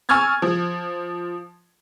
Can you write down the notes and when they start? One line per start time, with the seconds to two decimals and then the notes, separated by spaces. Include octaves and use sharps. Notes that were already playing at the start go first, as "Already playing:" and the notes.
0.09 G#5 C#6 E6 F6 G#6 A6
0.42 F3